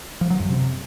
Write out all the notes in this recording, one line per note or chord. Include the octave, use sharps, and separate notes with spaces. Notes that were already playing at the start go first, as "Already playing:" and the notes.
F3
F#3
F#2
C3